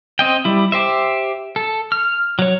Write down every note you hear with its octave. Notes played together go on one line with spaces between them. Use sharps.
C4 D#5 G5
G3 E4
G4 C5 E5
A4
F6
F#3 C#5